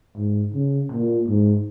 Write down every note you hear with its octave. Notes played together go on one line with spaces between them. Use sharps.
G#2
C#3
A#2
G#2